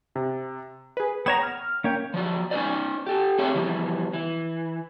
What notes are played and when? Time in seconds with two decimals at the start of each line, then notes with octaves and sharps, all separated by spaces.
0.16 C3
0.97 G#4 B4
1.26 B3 C#5 F#5 G5 A#5 E7
1.43 F6
1.84 A#3 C#4 C#5 G5
2.14 F3 F#3 D5
2.51 C#4 D#4 E4 C5 D5
3.06 G4 A4
3.38 A3 C4 G4 G#4 C#5 F5
3.54 B2 E3 F3 G3
4.13 E3